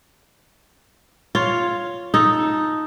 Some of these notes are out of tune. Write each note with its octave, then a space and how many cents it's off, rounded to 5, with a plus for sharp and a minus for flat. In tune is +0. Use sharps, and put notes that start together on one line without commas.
F4 +0 C#5 +5
D#4 +0 A4 +0